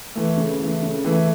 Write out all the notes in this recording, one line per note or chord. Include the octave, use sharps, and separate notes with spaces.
E3 A3
C#3
E3 A3
C#3
E3 A3